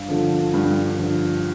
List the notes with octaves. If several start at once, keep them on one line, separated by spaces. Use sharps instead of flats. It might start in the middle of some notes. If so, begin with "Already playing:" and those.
Already playing: G2 F5
D3 F3
G2
D3 F3